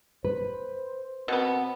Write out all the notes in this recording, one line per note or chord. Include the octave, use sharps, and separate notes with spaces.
B4 C5
B2 B3 C4